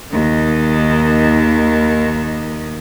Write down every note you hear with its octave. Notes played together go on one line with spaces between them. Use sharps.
D#2 D#3